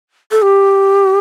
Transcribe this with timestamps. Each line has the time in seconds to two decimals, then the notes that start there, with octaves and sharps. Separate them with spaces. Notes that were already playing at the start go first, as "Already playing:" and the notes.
0.31 A4
0.42 G4